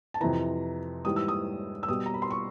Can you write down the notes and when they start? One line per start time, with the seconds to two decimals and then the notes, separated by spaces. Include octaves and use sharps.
0.14 A5
0.21 F2 C3 E3 A#5
1.05 G#2 E3 G3 D#6
1.16 E6
1.28 D#6
1.83 E6
1.88 B2 G3 D#6
2.06 A#5
2.14 B5
2.22 C6
2.31 C#6